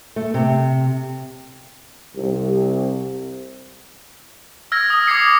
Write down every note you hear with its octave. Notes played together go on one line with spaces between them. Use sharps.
A3
C3
C2 C3
E6 F6 G#6 A#6
D#6
D6 G#6 A#6 C7 C#7
D6